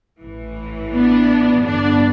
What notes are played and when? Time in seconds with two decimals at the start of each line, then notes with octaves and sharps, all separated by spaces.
0.20 A1 A2 E3
0.92 B3 D4
1.63 A1 G2 D3 B3 D4